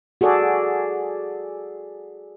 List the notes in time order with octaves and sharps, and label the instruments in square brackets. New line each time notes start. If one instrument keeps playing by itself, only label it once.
[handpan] F#4 G#4 A4 D5